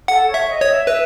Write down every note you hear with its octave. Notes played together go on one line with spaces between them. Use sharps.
A4 F#5
C#5
E5
D#5
C#5
E5
B4 E5